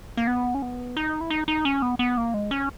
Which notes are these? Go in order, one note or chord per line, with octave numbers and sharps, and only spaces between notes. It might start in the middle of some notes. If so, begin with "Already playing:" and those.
A#3
B3
C#4
B3
D#4
E4
D#4
D#4
C#4
B3
B3
A#3
G#3
C#4